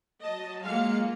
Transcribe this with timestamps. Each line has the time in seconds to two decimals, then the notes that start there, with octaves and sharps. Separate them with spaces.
0.23 F#3 D#5 A5
0.64 F#3 G#3 A#3 F4 F5 C#7